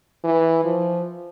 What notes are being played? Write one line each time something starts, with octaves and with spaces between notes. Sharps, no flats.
E3
F3